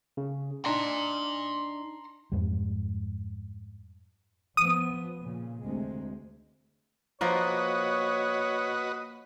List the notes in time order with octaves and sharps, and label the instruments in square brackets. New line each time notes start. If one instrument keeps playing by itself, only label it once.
[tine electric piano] C#3
[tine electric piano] D4 D#4 [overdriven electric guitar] A#5 C6
[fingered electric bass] F2 G#2 G3
[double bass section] F3 B3 [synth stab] D#6
[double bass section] A#2 C#3
D2 C3 G#3
[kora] F3 A#3 A#4 [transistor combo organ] F#4 B4 D#5 [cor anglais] C#5